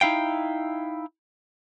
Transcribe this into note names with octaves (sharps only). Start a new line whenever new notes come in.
D#4 E4 F5 G5